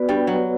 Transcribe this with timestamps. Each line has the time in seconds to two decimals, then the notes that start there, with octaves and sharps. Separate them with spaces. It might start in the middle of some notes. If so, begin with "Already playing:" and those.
Already playing: B3 F#4 B4 D5
0.09 G2 G3
0.27 F#3